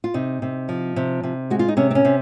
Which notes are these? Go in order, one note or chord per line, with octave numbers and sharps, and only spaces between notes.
F4
C3 D#4
C3
F3
C3
C3
G#3 F#4
F4
D#4
C3 C#4
C4
C#4
C3